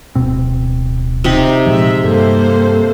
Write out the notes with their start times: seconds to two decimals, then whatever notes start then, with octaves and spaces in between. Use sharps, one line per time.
0.15 D1 B2 C4
1.24 C3 D#4 G4
1.66 A#2 F3 G#3 E5
2.04 G2 A#3 A4 C5